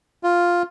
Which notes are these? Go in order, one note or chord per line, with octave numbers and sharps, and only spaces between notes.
F4